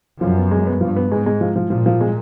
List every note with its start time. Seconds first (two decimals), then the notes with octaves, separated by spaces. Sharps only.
0.21 F#2 F3
0.37 B3
0.51 G#3
0.67 B3
0.81 G2 F3
0.96 B3
1.11 G#2 G#3
1.26 G#3
1.41 F3
1.56 F3
1.70 A#2 F3
1.86 F3
2.01 G#3